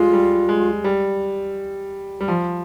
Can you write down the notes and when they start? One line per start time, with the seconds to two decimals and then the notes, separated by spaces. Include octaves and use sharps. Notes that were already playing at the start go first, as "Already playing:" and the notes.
Already playing: G3 G#3 F4
0.13 G3
0.49 G#3
0.84 G3
2.21 G3
2.28 F3